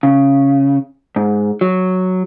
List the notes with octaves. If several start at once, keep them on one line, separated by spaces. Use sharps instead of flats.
C#3
G#2
F#3